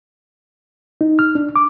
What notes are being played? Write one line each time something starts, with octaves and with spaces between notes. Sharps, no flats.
D#4
F6
D4
D6